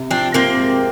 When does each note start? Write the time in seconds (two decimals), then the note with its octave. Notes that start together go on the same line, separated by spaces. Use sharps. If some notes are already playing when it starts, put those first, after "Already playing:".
Already playing: C3
0.10 F3 C4 D4
0.34 C3 A#3 C4
0.58 G#3